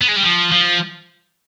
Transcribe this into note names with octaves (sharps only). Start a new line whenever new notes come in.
B3
G#3
G3
F3
F3